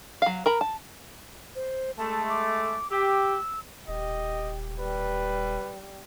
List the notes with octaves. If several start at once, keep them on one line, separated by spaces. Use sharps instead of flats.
F#3 F5
A#4 A#5 B5
A5
C5
G#3 A3 A5
D6
G4 E6
D#1 G4 D#5
G3 B4